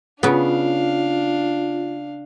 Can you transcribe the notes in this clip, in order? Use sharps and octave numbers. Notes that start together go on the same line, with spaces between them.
C#3 B3 D4 F4 F5